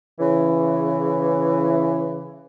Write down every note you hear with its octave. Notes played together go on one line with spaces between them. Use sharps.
C#3 E3